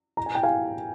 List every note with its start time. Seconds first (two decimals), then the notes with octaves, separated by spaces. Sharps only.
0.17 A#5
0.26 G#5
0.35 G5
0.43 F5 G#5